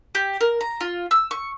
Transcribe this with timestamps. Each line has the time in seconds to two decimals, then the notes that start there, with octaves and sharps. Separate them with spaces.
0.15 G4
0.41 A#4
0.61 A#5
0.81 F4
1.11 E6
1.31 C#6